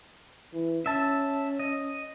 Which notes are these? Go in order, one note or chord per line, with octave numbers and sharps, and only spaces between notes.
E3
C#4 E5 A5
D#5